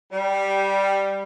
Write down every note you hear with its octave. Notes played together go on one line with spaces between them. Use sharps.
G3